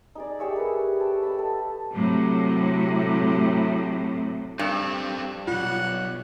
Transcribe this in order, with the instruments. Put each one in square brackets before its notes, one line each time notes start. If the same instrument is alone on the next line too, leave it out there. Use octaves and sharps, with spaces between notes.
[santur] D#4 G#4 D5
G4 G#4 C#5 E5
A#4 B4 B5
A4 G5
D#5 A5 B5
A4
[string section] A2 C3 F#3
[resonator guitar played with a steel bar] G2 [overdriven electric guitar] C4 A4
[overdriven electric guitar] B1 F#2 [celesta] F4 [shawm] F#5